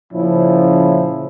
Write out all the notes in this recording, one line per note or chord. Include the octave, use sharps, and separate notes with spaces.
A#2 C#3 F3 C#4 E4